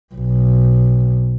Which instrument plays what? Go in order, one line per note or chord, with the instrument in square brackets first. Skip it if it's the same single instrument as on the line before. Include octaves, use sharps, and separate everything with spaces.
[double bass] B1